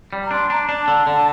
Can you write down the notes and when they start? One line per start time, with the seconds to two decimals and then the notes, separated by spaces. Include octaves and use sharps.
0.13 G3
0.23 A#5
0.31 D4 C6
0.50 D4 A#5
0.68 D4 A5
0.88 D3
1.07 D3